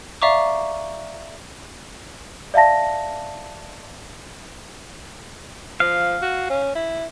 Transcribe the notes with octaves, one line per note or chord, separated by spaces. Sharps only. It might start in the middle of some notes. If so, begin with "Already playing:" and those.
D5 E5 F5 A#5 C#6 D6
D5 E5 F5 A5 A#6
F3 F5
F#4
C#4
E4